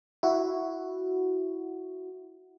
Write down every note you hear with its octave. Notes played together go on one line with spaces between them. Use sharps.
E4 F#4